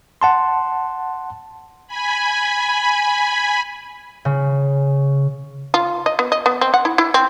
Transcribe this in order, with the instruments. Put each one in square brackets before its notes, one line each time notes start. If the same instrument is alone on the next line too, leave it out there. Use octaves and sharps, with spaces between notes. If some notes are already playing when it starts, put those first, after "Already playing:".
[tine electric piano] F#5 A5 C6
[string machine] G#5 B5
[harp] C#3
[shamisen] F4
D#5
B3
D#5
B3
C4
F#5
E4
E4
C4